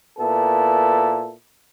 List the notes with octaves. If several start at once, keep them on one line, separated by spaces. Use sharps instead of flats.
A#2 B3 E4 A4